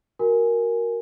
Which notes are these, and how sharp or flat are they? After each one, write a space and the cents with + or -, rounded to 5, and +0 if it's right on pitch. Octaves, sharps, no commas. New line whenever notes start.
F#4 +0 A#4 +0 G#5 +0